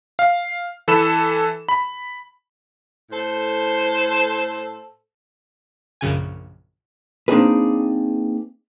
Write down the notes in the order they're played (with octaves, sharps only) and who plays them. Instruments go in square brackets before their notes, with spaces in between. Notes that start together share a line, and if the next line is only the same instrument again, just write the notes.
[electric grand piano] F5
E3 A4 B5 E7
B5
[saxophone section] A2 A4 C5
[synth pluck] A#1 F#2 C#3 G#5
[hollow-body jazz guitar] A#3 C4 D4 D#4 G#4 B4